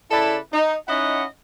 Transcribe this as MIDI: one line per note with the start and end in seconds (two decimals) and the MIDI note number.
0.11 0.37 49
0.11 0.37 64
0.11 0.37 69
0.11 0.37 71
0.11 0.37 74
0.11 0.37 81
0.53 0.75 63
0.88 1.24 61
0.88 1.24 63
0.88 1.24 64
0.88 1.24 75
0.88 1.24 78